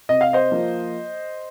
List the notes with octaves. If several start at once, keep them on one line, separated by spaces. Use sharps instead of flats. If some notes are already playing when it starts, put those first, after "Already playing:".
C3 D#5
F5
C5 D#5
F3 A#3